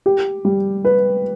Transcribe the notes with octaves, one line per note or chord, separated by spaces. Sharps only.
G4
G3
B4